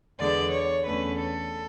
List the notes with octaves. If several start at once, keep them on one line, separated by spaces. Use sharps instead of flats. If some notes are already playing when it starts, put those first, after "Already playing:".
E2 D3 G#3 B3 D5
C#5
E2 D3 A3 C#4 B4
A4